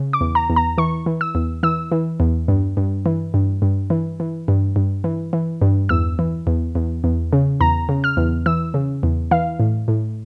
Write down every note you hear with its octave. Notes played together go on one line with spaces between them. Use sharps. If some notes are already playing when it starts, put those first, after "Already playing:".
Already playing: C#3
D6
E2
A#5
E2
A#5
E3 C#6
E3
E6
E2
E3 E6
E3
E2
G2
G2
E3
G2
G2
E3
E3
G2
G2
E3
E3
G2
E2 E6
E3
E2
E2
E2
C#3
E2 A#5
C#3
F6
E2
E3 E6
C#3
E2
E3 F5
A2
A2